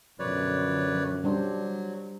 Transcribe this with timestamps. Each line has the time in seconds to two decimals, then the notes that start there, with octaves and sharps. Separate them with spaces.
0.19 F#2 B2 D3 F3 B4 C#5 D5
1.24 F#3 G3 D4 C5